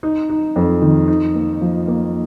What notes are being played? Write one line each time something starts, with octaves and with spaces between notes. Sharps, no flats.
D#4
D#4
F2
D#3
D#4
A#3
F3
A#3